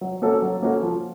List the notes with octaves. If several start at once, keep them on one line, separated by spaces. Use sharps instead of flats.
F#3
A#3 C#4 F#4 A4
F#3
A#3 C#4 F#4 A4
F3